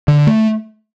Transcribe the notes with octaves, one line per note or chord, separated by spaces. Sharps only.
D3
A3